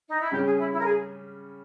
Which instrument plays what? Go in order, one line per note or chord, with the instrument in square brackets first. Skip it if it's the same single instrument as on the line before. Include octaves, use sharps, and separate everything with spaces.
[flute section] D#4
E4
[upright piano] C#3 G3 C#4 [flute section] G4
[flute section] G#4
E4
E4
A#4
G#4